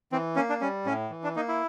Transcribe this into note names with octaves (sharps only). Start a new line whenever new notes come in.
E3 C4
A#3 C#4
D4
G3 C#4
A2 C#4
E3
D4
A#3 D#4
E4